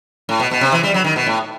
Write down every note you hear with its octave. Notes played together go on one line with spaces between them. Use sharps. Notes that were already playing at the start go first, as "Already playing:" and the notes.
A2
B2
B2
C3
E3
G3
F#3
D#3
B2
A2